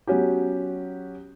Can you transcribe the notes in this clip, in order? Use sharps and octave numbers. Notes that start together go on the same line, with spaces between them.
F#3 B3 C#4 F#4 G4